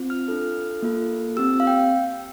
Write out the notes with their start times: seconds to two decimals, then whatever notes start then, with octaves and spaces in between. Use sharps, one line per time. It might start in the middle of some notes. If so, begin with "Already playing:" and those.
Already playing: C4 F4
0.10 F6
0.28 D4 F4 A4
0.82 A#3 F4 A4
1.37 C4 G4 E6
1.60 F5
1.67 G5